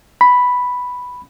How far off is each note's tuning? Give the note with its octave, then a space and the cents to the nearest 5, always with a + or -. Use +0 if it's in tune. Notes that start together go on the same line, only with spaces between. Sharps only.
B5 +0